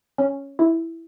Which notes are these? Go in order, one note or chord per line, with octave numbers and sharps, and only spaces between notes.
C#4
E4